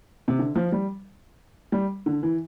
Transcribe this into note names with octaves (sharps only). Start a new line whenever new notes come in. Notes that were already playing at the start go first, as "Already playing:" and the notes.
C3
D3
F3
G3
G3
D3
E3